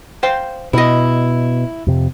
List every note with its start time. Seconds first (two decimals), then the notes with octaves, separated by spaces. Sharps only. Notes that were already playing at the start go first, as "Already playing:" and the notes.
0.23 C5 F5 G5
0.73 B2 E4 D#5
1.87 F2 C3